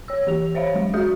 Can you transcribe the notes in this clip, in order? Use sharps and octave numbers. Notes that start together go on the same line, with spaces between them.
C#5 E6
E3 G4 F7
C5 C#5 E5 F5
F#3 G#3
G#3 F#4 G#4 E5 D#6 G6